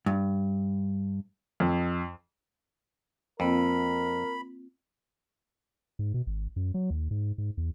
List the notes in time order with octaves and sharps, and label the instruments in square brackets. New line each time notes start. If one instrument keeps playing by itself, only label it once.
[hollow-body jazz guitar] G2
[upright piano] F2
[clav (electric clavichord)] F2 [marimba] A#3 C4 F4 [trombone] A#4 [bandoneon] B5
[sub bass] G#2
B2
G#1
F#2
F#3
D#2
G#2
G#2
E2